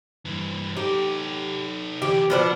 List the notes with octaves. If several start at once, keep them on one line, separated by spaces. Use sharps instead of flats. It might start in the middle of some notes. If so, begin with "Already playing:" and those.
G2 E3
D#4 G4 A4
D3 E3 G4
B2 F3 B3 D4 B5